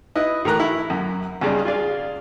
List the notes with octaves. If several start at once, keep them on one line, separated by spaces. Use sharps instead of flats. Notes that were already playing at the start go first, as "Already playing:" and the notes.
E4 B4 D#5
A2 E3 A#4 A#5 F#6
E4
F#2
C#2 G2 C#3 G#3 D5
F4 G#4 D5 F5